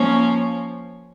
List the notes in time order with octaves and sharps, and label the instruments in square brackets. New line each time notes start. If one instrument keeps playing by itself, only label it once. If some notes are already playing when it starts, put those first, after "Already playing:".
Already playing: [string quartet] F3 A#3 C#4